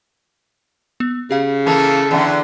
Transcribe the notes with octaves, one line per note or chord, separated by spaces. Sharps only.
B3
C#3 G4 F5
E3 A#3 A4
E2 B2 D3